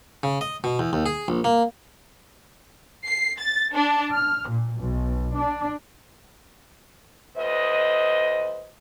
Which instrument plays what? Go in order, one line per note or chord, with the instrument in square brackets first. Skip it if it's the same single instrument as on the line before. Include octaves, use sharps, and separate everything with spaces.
[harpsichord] C#3
D#5
B2
E2
D#2
G#4
A#1
A#3
[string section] C7
A6
D4
F6
A#2
B1
D4
[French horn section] D2 B4 C5 D#5